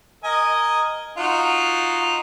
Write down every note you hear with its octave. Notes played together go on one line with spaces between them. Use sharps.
A#4 D#5 G#5
D#4 F4 F#4